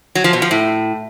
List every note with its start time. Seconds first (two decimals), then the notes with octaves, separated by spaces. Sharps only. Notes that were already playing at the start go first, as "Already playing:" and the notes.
0.15 F#3
0.24 F3
0.33 B2
0.42 F3
0.51 A2